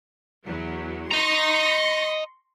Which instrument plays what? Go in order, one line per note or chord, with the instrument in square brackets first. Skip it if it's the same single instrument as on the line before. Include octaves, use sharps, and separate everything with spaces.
[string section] E2 F#3
[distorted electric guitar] D#5 A#5 [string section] C6 C#6 A#6